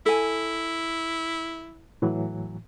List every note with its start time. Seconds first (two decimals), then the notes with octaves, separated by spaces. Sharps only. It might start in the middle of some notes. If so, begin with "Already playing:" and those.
0.06 E4 A4 G#5
2.02 A2 E3 F#3